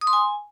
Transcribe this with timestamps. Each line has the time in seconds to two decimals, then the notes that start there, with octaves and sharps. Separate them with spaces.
0.01 D#6
0.07 C6
0.13 G#5